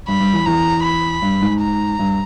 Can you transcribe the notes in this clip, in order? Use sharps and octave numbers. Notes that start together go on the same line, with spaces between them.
G2 B5
G2
E2
E2 A#5
B5
G2
G#2
A#5
G2